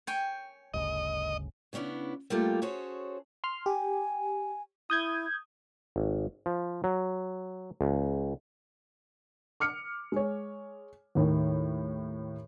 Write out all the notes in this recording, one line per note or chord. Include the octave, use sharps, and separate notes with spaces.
C#5 G5 G#5
G1 D2 C#3 D#5
C#3 B3 C#4 D4 E4
G3 A3 A#3 F4 G4 A4
C#4 F#4 G#4 A4 C5 C#5
C6 F6
G4 G#5
E4 D#6 G6 G#6
G#1
F3
F#3
C#2
D6 F6 C#7
G#3 C#5
D#2 A2 D#3